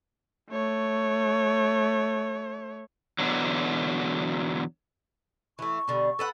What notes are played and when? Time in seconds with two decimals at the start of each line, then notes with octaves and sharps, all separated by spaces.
0.50 A3 C#5
3.19 E2 B2 D3 F#3
5.59 E3 A3 C#6
5.88 B2 D3 G3
6.19 A4 B4 F#5